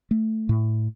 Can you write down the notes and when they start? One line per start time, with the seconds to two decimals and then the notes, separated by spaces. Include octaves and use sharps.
0.11 A3
0.49 A2